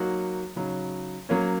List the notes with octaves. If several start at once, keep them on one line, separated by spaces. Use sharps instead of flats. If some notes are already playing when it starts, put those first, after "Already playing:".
Already playing: F#3 A#3 D#4 F#4
C#3 F#3 D#4
F#3 A#3 C#4